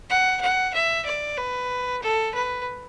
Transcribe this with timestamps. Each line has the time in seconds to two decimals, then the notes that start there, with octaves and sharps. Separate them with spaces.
0.10 F#5
0.41 F#5
0.74 E5
1.05 D5
1.37 B4
2.02 A4
2.34 B4